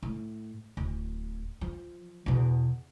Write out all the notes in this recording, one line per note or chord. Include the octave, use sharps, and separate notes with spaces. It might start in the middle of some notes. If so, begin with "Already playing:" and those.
A2
D1
F3
E2 B2